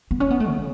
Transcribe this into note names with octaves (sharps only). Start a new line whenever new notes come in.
B3
C#4
B3
A3
C#3